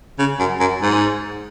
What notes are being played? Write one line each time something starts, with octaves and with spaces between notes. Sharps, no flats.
C#3
F#2
F#2
G#2